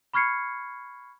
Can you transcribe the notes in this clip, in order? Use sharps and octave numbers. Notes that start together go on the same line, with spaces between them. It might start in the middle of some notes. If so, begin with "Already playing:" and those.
B5 C#6 F6 G#6 C7 C#7